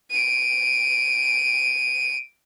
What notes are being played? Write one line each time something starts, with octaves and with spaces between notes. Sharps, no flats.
D7 D#7